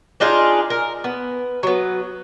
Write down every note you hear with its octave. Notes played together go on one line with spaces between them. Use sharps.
D4 D#4 F4 G#4
A#4
B3
F#3 B3